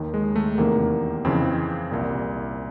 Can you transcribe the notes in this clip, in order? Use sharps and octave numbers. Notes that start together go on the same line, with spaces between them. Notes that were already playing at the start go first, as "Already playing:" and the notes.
Already playing: D#2 D#3
G#3
A3
E2 C3 D#3 A#3
F2 C#3 E3 C4
C2 A#2